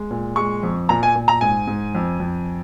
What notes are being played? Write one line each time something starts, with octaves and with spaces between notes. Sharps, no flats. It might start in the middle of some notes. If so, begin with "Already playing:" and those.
Already playing: G#3
A#2
G#3 C#6
F2
A#2 A#5
G#5
A#2
A#5
G#2 G#5
G#2
F2
F2